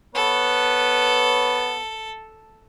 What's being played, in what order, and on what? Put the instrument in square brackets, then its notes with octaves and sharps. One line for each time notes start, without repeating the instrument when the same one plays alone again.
[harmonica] B3 B4 C#5 [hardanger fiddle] A4